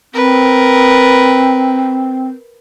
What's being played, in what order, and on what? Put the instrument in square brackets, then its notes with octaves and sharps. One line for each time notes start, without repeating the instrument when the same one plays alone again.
[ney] C4 [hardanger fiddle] A#4 B4